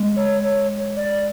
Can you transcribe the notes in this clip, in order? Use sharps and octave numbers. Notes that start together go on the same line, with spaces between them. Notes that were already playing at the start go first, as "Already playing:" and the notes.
Already playing: G#3
C#5
C#5
D5